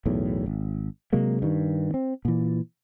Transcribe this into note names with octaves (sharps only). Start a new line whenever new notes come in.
B1 E2 A2
G#1
C3 F#3 G#3 A#3
G2 D#3
C4
A#2 E3